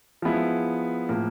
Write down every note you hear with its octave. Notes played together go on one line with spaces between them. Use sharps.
F3 G#3 B3 E4
A2 F3 A#3